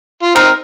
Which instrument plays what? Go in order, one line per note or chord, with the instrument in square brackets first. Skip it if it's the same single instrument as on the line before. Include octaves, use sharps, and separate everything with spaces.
[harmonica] F4
[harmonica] C4 D#4 [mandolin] A#4